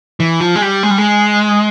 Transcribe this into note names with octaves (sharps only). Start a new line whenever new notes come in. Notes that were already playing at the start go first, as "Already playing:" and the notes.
E3
F3
G#3
G3
G#3
G3
G#3